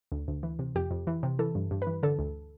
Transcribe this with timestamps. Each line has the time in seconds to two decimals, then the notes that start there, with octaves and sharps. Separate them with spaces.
0.12 D2
0.28 D2
0.43 E3
0.59 C3
0.75 F2 G4
0.91 F2
1.07 E3
1.23 C3
1.39 E3 A4
1.55 G2
1.71 G2
1.82 B4
1.87 E3
2.03 D3 A4
2.19 D2